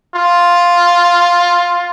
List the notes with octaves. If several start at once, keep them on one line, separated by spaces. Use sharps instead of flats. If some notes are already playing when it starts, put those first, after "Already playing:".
F4